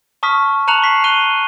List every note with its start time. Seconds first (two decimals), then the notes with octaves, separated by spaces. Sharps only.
0.23 A5 C#6 D#6 F6 B6
0.68 A5 A#5 F#6 C#7 F7 F#7
0.82 C#6 B6 C7
1.04 F#6 D#7 F#7 G7